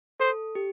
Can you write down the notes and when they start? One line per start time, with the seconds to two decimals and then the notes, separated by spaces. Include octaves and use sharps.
0.20 A4 C5
0.55 G4